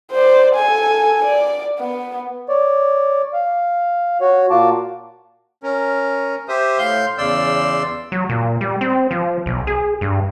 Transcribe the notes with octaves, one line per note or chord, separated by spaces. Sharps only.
C5 D5
A4 G#5
D5
B3
C#5 D5
F5
F#4 C#5
A#2 A#3 F4 F#4 A5 D6
C#4 A#4
G4 C5 E5 D#6
A2 F5 C6 G6
E2 C#3 D5 C6 E6
F#3
A#2
G3
C4
F3
B1
G#4
G2